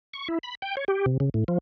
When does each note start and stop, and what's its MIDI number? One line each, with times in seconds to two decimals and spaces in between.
0.14 0.28 85
0.28 0.38 64
0.43 0.55 83
0.62 0.75 79
0.77 0.85 73
0.88 1.06 67
1.06 1.18 48
1.20 1.29 49
1.34 1.44 45
1.48 1.58 53